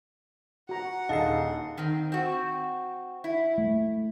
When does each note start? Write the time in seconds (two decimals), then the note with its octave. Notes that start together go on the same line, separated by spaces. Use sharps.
0.69 F#4 F#5 A#5
1.09 D#1 D3 D#4 G#4 D#5 F5 A5 C7
1.77 D#3 C4
2.12 C4 F#4
3.24 E4
3.58 A3